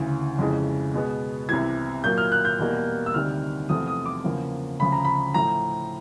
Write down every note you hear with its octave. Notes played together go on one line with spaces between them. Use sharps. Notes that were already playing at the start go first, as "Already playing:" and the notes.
Already playing: D2 C#3 E3
F2 C#3 E3 G#3
B2 G#3 B3
C2 C3 E3 G#6
A#2 F#3 A#3 G6
F6
F#6
G6
E2 B2 G3 A#3
E6
D2 C3 D#3 G3 F6
E2 C3 F3 A3 D#6
D#6
D6
E2 C#3 F3 A#3
D2 C#3 F3 B5
A#5
B5
A2 F3 A3 A#5